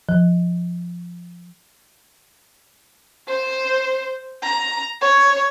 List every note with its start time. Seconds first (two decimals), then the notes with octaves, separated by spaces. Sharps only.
0.09 F3
3.28 C5
4.43 A#5
5.02 C#5